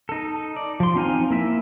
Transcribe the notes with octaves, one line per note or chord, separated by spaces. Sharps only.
D#4 A4
D5
F3 C6
C4 D#4 F5 G#5
A#3 E4 E5